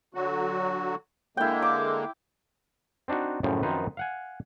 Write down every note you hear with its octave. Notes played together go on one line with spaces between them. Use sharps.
D3 F#3 F#4
D3 G#3 A#3 E4 G5
D6
C4 D4 D#4 F#4
F#2 A2 C#3 F3
F#2 D#3 F3 C4 D#4 B4
F5 F#5 G#5